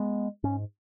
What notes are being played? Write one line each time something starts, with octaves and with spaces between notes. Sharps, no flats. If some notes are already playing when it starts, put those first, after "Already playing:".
Already playing: G#3 B3
G#2 C#4